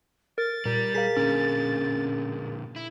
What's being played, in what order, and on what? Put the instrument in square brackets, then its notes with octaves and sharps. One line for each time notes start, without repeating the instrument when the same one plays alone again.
[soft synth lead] A#4 [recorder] A6
[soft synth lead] A#2 [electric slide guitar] G3 [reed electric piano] A#4
[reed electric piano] G#4 A#4 F5 [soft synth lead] B6
[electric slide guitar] A#2 D3 [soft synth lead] C#4
[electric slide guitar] E4